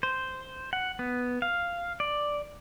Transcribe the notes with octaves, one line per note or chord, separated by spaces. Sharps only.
C5
F#5
B3
F5
D5